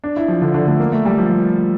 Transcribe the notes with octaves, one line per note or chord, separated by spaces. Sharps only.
D4
E4
F3
D3
D3
A3
A#3
A3
G3
F3